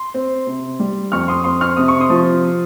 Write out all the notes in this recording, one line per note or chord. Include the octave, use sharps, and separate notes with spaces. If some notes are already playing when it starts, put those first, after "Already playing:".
Already playing: C6
C4
C3
G3
F2 C#6 F6
C6 D#6
C4 C6 D#6
C#6 F6
C3 D#6
C#6
C6 D#6
F3